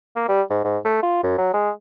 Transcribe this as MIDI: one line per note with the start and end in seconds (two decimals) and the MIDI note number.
0.16 0.28 58
0.28 0.42 55
0.50 0.64 44
0.64 0.78 44
0.85 1.02 57
1.03 1.21 65
1.23 1.33 42
1.38 1.52 54
1.54 1.70 56